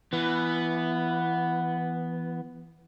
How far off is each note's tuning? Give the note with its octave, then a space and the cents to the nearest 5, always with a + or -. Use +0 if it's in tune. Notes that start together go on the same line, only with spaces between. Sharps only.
E3 +20 B3 +0